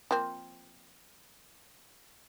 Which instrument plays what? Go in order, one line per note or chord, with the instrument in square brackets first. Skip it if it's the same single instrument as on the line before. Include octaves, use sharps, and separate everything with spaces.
[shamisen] F3 A#3 C4